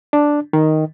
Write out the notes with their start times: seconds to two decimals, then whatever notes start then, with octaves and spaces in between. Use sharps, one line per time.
0.13 D4
0.53 D#3